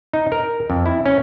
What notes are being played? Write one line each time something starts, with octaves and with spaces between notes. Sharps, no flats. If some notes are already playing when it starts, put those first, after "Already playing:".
D#4
A#4
F2
E4
C#4